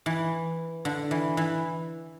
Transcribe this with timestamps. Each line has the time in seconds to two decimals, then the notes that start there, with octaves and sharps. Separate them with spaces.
0.06 E3
0.85 D3
1.11 E3
1.37 E3